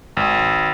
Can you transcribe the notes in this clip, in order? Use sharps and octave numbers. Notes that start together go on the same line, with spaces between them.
G#1